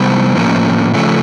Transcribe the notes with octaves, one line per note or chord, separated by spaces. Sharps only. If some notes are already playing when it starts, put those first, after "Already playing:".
Already playing: C3 E3 G3 B3 C5
A2 F3 A#3 C#4
C#3 F3 A3 C#4